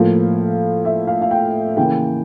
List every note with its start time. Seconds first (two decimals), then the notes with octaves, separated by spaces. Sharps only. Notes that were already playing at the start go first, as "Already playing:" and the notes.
Already playing: A2 F3 A#3 F5
0.85 E5
1.07 F5
1.21 F5
1.31 G5
1.77 C#3 E3 A#3 G5